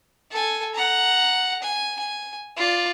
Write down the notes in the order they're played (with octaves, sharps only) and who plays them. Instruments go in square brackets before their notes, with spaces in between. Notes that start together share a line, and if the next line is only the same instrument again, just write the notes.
[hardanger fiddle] A4 G#5
F#5 A#5
G#5
G#5
F4 D5